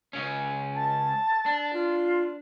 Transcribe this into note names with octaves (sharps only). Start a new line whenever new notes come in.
C#2 C#3 C#4
A5
D4
F4